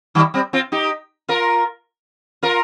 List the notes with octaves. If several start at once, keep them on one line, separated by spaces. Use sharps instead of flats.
D#3 G3
G3 C4
C4 F4
D#4 G4
F4 A#4
F4 A#4